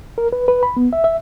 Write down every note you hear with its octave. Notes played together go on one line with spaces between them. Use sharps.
A#4
B4
B4
B5
B3
E5
E5